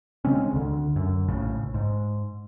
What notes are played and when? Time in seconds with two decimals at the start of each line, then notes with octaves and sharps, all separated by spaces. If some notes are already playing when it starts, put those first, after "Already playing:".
0.25 C#3 G#3 C4 C#4
0.53 D2 D3
0.96 F#2
1.29 A#1 A2 C#3
1.74 G#2